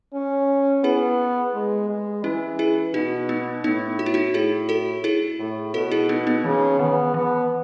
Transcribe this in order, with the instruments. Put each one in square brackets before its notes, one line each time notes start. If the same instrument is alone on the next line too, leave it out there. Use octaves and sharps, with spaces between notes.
[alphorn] C#4
[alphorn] B3 [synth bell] E4 G#4
[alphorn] G#3
G#3
[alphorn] E3 [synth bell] C#4 E4
[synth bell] E4 G#4
[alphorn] B2 [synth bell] D#4 F#4
[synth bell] B3 D#4
[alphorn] A2 [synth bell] B3 D#4
[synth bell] F#4
E4
D#4 F#4
[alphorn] A2 [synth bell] E4 G#4
[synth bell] F#4 A4
E4 G#4
[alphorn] A2
[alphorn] B2 [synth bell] F#4 A4
[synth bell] E4 G#4
B3 D#4
B3 D#4
[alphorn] C#3 [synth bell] E3
[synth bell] D#3 [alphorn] B3
[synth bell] E3 [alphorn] B3